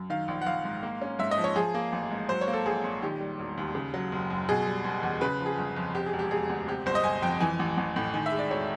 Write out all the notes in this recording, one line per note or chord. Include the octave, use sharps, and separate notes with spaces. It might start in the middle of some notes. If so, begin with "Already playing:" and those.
Already playing: F#2
D#3 F5
A#1
F#5
A#1 F5
G#2
A#3
C#4
G#2 E5
D#5
F3
C#5
F3 G#4
A#3
A1
G#2
F#3 C5
C#5
A#3
A4
A#1 G#4
A#2
D#3 G4
G3
E1
D#2
C#3
F#3
F#1
F#2
B2 G#4
G3
F#1
E2
C#3 B4
F3
G#4
G1
F2
C3 G4
G#4
E1
G4
E1 G#4
D2
C3 G4
G1 C5
D#5
G1 G#5
F2 G5
E3 G#5
A1
A1
A2
D#3 G#5
E5
G#3
D5
E1 C#5